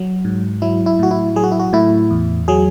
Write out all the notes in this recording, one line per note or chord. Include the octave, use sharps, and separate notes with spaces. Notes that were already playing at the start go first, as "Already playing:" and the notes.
Already playing: F#3 F#4
G#2
F#3 E4
E4
A2 F#4
E4
F#3 G#4
F#4
E4
F#4
A2 E4
E2
F#3 G#4